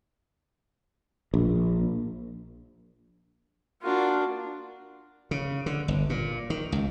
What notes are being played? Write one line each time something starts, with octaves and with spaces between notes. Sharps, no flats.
A#1
A#3 D4 F4 F#4
C#3
D3
G1
A#2
D#3
C#2